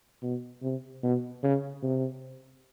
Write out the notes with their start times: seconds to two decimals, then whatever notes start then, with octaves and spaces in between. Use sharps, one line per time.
0.23 B2
0.63 C3
1.03 B2
1.43 C#3
1.83 C3